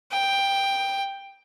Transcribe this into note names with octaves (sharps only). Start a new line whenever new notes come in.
G5